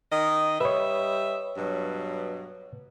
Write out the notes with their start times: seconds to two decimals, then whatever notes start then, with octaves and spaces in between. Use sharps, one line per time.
0.11 D#3 D#5
0.61 G3 B4 C#5 D#5 E5
1.57 G2 B2 F#3